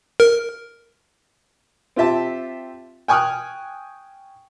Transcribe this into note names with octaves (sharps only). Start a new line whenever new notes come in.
A#4
C4 F4 G4 E5 A5
G5 G#5 C#6 D#6 F6 F#6